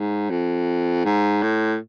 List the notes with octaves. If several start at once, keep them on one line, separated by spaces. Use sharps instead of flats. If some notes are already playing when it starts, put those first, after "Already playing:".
Already playing: G#2
F2
G#2
A2